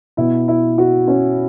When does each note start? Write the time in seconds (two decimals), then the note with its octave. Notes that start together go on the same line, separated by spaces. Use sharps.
0.17 B2 E4
0.48 E4
0.78 F#4
1.07 C#4